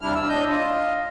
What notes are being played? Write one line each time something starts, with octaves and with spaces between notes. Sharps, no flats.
D#2 C3 G3 D4 E4 F6
E6
A2 D4 D#5 G6
F4 D#5